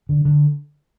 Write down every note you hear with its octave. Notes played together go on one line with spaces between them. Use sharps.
D3
D3